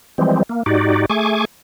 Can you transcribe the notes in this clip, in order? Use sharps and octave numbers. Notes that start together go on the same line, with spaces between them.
E3 F3 G3 G#3 C4
A#3
G#2 D#4 F#4 G4 D5
A3 G#4 G#5 C#6 D6